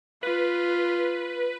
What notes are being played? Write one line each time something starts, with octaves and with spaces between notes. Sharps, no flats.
F4 B4